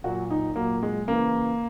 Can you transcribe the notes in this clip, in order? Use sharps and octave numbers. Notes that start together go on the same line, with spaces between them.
A#2 F#3 F#4
D#4
A#2 F#3 A#3
G#3
C#3 E3 A#3